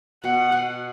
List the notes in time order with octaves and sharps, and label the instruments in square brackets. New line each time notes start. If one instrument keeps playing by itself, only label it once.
[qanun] B2 [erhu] F#5
[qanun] B2